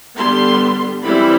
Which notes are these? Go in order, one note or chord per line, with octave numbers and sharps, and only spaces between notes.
D3 G3 B3 C6
E3 G3 C4 E4 B5